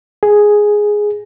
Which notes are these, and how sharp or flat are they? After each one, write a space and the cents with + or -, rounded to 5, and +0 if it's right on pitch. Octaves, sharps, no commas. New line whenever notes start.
G#4 +0